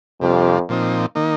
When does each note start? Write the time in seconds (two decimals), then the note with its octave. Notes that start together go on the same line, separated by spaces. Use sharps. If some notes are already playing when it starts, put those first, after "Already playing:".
0.21 F2 C3 G3 D4 F4
0.69 A#2 F3 C4 D#4
1.15 D#3 A#3 D#4